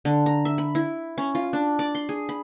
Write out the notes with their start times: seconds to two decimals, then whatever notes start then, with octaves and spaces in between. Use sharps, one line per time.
0.05 D3
0.26 A#5
0.45 E5
0.58 B5
0.75 E4
1.18 C#4
1.35 F4
1.53 D4
1.79 D5
1.95 C6
2.09 G#4
2.29 B5